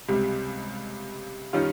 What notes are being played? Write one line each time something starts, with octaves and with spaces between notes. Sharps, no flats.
C#2 C3 G3
D#3 G3 C#4 F4